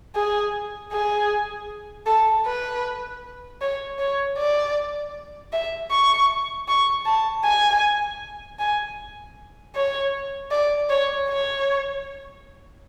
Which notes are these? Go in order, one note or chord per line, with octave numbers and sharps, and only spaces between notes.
G#4
G#4
A4
B4
C#5
C#5
D5
E5
C#6
C#6
A5
G#5
G#5
C#5
D5
C#5
C#5